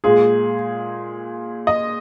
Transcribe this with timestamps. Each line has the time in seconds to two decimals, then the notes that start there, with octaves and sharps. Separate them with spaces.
0.04 A#2 G#3 G#4
1.67 D#5